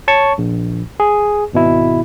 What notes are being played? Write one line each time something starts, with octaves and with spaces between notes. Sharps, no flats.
C#5 A5 C#6
A#1
G#4
G#1 B2 E4